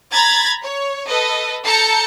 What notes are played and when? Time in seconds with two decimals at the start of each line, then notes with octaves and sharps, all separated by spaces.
0.12 A#5 B5 G#6 A6
0.63 C#5
1.08 A4 B4 D#5
1.64 A4 A5 A#5 G6 C#7